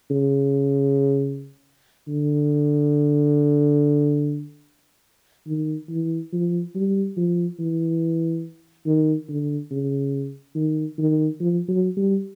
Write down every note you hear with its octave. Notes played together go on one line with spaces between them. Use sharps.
C#3
D3
D#3
E3
F3
G3
F3
E3
D#3
D3
C#3
D#3
D#3
F3
F#3
G3